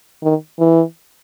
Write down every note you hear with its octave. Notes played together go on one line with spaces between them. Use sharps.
D#3
E3